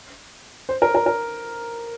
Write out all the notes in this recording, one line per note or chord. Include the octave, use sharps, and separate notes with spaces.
C5
A#4
A#4
A#4